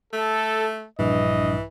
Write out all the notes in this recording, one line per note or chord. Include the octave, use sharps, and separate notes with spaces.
A3 A4
A#1 G2 E3 D#5